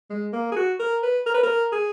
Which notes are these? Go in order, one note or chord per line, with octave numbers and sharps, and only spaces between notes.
G#3
A#3
G#4
F#4
A#4
B4
A#4
B4
A#4
G#4